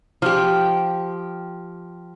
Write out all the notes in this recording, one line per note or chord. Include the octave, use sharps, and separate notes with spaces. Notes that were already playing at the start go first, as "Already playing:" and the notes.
F3 G4